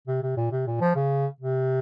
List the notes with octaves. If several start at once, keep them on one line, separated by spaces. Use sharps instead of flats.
C3
C3
A#2
C3
A#2
F3
C#3
C3